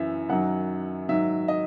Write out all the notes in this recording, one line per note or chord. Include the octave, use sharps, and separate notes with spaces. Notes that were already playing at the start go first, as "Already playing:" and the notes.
Already playing: F#2 E3 E5
F#2 D#3 F#3 F#5
G#2 D#3 F#3 E5
D#5